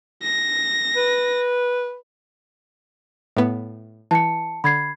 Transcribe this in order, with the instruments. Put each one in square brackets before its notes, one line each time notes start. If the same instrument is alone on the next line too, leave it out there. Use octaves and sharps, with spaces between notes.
[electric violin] A#6
[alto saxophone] B4
[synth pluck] A2 B3
[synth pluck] E3 [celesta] A5 C#7
[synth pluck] D3 [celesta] B5 G#6 C7